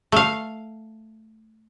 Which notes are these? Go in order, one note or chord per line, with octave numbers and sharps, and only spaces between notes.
A3 F5